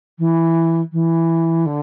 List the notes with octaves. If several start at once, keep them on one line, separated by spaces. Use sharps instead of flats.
E3
E3
D3